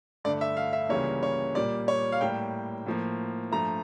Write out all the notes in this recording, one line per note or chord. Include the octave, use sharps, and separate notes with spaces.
G2 D3 A3 D5
E5
F5
E5
C#2 C#3 E3 G3 A#3 C#5
C#5
A#2 G3 A#3 D5
C#5
F5
A2 G3 A#3 G5
A2 F3 A#3
G2 F3 A3 A#5